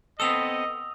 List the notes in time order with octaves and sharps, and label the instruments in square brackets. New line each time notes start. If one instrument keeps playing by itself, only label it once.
[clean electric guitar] B3 C4 A4 [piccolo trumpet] D#5 [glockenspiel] D#6 E6 F7